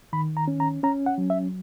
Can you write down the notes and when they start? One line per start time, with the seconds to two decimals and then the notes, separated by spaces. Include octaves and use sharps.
0.13 D#3 B5
0.37 A#5
0.48 C#4
0.60 A#5
0.83 C#4 A#5
1.06 F#5
1.18 F#3
1.30 E5